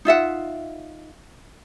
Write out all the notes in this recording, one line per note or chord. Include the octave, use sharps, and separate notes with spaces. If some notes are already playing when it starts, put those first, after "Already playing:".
D#4 F4 E5 F#5